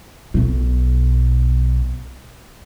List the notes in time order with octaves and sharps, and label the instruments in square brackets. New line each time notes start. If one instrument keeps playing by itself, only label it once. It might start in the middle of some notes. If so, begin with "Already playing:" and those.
[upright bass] B1 B2